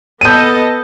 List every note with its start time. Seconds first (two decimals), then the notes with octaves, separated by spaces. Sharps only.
0.21 B3 A4 D#5 G6 D#7